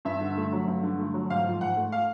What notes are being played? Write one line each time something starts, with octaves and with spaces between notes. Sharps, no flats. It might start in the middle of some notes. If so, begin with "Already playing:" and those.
G2 E5
D3
A3
F#3
G2
D3
A3
F#3
G#2 F5
F3
G#2 F#5
A3
F5